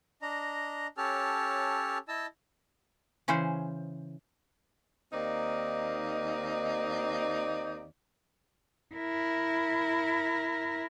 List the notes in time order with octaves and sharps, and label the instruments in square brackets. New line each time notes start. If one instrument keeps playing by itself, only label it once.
[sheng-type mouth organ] D4 D#5 A#5
C#4 G4 A4 C#5 A5 F6
E4 D#5 A5 E6
[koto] C#3 E3 C#4 G#4 C5
[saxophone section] D#2 A#3 C4 D#4 D5 D#5
[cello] E4 A#4